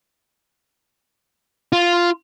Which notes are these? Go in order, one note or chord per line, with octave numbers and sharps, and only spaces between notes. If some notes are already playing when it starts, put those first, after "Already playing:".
F4